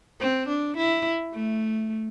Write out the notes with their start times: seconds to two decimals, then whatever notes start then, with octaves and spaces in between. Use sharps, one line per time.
0.20 C4
0.48 D4
0.77 E4
1.34 A3